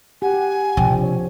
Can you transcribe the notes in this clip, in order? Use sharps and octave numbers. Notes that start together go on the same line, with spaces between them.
G4 F#5 G#5
C3 F3 D4 G5
C#5